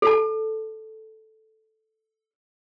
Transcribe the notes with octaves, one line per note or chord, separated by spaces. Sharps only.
A4 A5